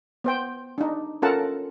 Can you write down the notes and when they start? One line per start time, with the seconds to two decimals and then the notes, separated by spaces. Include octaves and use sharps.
0.24 B3 C5 G5
0.78 D4 D#4
1.22 C#4 F4 A4 A#4 F#5 A5